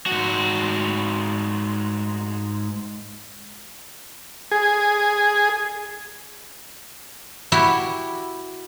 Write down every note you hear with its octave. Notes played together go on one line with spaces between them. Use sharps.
G#2 F#4
G#4
E4 F#4 G4